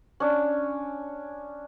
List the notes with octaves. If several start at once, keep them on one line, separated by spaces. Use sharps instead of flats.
C#4 D4